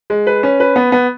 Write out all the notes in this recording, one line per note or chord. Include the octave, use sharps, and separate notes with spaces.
G#3
B4
C#4
B4
B3
B3